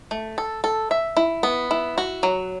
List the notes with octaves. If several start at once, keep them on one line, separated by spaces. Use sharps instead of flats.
A3
A4
A4
E5
E4
B3
E4
F#4
F#3